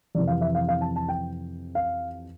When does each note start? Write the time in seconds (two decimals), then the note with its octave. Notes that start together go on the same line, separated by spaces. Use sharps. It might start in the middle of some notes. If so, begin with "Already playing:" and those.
0.15 F2 C3 E3 D5
0.27 F5
0.41 E5
0.55 F5
0.68 F5
0.81 A5
0.96 A5
1.08 G5
1.75 F5